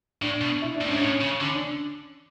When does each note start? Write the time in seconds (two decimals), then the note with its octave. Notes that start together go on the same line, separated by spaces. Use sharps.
0.22 A2 D4
0.41 B2
0.62 E4
0.75 D4
0.81 A2
0.88 G#2 C#4
1.01 A2 C#4
1.21 C#3
1.41 D3 C#4
1.55 D4